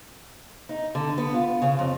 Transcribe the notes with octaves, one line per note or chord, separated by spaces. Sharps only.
D#4
D3
B3
F4
C#3
F2